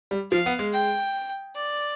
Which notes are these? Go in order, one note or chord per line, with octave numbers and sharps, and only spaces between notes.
G3
F3 F5
B3
G#3
G5
D5